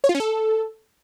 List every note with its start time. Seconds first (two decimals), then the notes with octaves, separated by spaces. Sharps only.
0.04 C#5
0.09 F4
0.15 C#4
0.20 A4